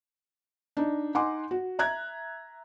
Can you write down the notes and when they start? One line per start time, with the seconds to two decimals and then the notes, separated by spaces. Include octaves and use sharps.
0.77 D4 D#4
1.15 D#4 F#5 G#5 C6 D6
1.51 F#4
1.79 E5 A#5 F#6 G#6